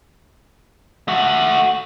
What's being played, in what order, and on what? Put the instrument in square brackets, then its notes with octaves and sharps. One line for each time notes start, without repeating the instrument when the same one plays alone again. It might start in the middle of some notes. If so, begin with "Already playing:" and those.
[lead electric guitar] A3 F#4